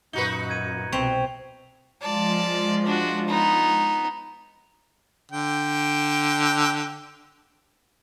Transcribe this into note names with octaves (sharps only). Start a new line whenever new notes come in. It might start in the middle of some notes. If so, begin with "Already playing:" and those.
F#2 A#2 D#4 F#4 B4 G7
G6 G#6 D#7
C2 B2 C4 C#6 B6 F7
F3 G#3 F4 D5 A5
D4 F#4
B3 D#4
D3 G5